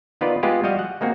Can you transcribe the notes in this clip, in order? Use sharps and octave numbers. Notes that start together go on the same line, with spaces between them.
D#3 B3 D#4 F4 B4 D5
G#3 B3 F4 G4
G3 F#4 D#5 F5
F#5
G#3 A#3 C4 F#4